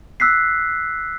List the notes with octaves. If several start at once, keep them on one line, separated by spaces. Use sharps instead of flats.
E6 F#6 B6 C7